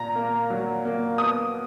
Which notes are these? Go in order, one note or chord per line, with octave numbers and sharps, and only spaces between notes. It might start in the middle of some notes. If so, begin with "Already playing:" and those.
Already playing: A#2 A#5
A#3
F#3
A#3
B3 D#6